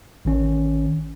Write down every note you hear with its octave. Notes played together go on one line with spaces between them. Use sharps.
A1 D#3 C#4